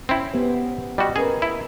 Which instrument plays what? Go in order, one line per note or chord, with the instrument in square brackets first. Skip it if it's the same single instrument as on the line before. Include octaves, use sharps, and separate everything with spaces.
[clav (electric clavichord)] C4 E4 [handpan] C#4
[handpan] B3 G4 C5
[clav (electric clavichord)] G3 F#4 [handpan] D#5
[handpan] C#4 A#4 B4 [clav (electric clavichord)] G#4
[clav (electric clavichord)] E4